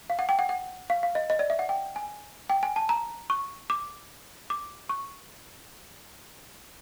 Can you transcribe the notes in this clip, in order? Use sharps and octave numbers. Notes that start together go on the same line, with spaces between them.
F5
F#5
G5
F#5
F#5
F5
F5
D#5
D#5
D5
E5
F#5
G5
G#5
G5
G#5
A5
A#5
C#6
D6
D6
C#6